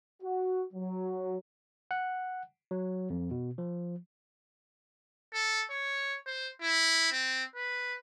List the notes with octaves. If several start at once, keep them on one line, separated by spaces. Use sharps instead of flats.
F#4
F#3
F#5
F#3
F2
B2
F3
A4
C#5
C5
E4
C4
B4